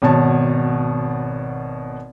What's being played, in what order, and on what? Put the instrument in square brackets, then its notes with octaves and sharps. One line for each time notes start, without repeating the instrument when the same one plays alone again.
[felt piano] G#1 B2 C#5 A5